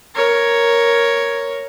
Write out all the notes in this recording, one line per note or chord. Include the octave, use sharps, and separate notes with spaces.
A#4 C#5